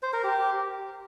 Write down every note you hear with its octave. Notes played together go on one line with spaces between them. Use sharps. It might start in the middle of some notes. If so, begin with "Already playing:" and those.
C5
A#4
G4